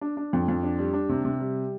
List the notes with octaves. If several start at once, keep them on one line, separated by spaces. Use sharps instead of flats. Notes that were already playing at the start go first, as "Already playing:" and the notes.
D4
D4
F2
F2
D4
G3
D4
C3
C3
G3